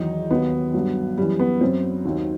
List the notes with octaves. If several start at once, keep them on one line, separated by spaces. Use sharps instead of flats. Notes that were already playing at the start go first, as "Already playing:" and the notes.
Already playing: E2 D#3 F#3 D#4
D#2 D#3 F#3 B3
G2 F#3
F#2 E3 G3
B3
F#2 F#3 C4
D#2 D#3 F#3